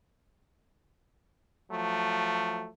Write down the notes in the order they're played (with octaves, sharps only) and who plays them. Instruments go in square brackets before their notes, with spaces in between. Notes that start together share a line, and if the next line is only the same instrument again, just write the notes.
[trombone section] F3 F#3 A3